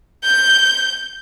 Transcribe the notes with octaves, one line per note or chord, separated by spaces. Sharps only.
G6